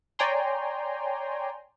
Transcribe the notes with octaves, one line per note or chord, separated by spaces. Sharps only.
C#5 D5 G5 G#5 A#5 C6